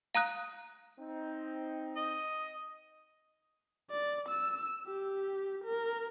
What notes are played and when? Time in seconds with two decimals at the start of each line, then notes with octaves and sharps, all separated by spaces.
0.15 F5 A#5 D#6 F#6
1.00 C4 D#4
1.96 D#5
3.90 D5
4.28 E6
4.87 G4
5.64 A#4